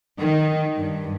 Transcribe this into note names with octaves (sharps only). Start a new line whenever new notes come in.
D#3
G2